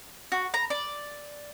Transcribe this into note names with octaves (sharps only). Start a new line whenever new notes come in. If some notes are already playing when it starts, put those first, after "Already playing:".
F#4
A#5
D5